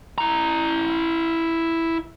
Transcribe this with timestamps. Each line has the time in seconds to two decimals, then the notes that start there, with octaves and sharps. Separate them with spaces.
0.18 E4 A#5